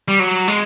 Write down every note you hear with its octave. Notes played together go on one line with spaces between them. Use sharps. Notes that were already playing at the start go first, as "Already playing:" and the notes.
G3
F#3
G#3